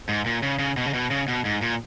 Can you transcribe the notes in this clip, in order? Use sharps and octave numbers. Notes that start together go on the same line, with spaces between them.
G#2
A#2
C#3
C#3
B2
C#3
B2
C#3
B2
G#2
A#2